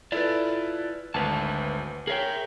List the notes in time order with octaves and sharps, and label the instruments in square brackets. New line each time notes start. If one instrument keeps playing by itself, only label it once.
[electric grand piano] E4 A4 B4 [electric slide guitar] F4 D5
[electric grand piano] G#1 D2 [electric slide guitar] B4 A5
[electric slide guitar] G#4 E5 G5 [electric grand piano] A#4 C#5